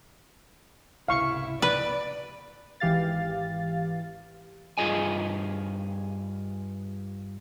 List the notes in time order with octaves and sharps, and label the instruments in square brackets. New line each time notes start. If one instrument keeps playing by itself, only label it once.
[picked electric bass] G#1 C#2 C3 [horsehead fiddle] E4 [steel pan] F5 C#6
[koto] B4 [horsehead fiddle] D5
[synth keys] G#1 E3 G4 F5 A6
[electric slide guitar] G2 F4 G#4 D#5 G#5